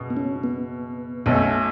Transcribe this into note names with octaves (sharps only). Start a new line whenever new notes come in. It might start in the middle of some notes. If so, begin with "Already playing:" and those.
Already playing: F#1 B2
B3
C#4
B3
B1 B2 A3 C#4